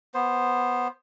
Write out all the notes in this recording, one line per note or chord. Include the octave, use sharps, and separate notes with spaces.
B3 C5